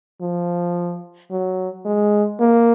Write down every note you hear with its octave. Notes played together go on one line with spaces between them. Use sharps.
F3
F#3
G#3
A#3